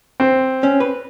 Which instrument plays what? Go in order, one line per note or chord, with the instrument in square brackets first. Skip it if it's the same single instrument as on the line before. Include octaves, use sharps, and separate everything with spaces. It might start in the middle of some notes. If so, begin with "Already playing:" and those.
[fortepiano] C4
[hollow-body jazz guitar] C#4
B4